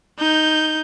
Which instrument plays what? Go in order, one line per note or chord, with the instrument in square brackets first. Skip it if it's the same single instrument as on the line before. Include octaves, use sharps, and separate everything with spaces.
[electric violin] D#4 G6